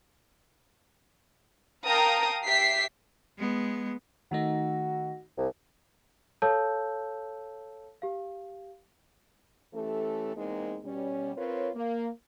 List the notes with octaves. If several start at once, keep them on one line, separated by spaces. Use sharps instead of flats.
A#4 F5 G5 A5 A#5 D#6
G4 E5 B6 C7
G#3 B3
D#3 A3 D#4 F#4
C2
A4 C#5 F5 A5 E6 G6
G4 F5
E3 A3 C#4 G4 A4
E2 G#3 A#3 C4 D#4 G#4
B2 G3 C#4
C4 F4 A#4 B4 C#5
A#3